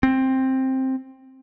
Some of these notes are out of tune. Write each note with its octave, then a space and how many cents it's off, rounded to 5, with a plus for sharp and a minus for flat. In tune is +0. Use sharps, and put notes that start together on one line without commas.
C4 +10